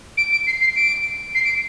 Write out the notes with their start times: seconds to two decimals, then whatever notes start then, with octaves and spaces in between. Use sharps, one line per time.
0.17 D7
0.32 D7
0.47 C7
0.61 C7
0.76 D7
1.35 C7
1.44 D7